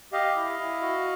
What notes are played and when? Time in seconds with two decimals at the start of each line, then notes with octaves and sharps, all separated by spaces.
0.13 G4 D#5 F5
0.36 E4
0.59 E4
0.82 F#4